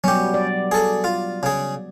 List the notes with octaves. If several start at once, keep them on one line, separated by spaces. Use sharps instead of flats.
F#3 G3 B3 C#4 G4
D5
G#4 A4
F4
C#3 G#4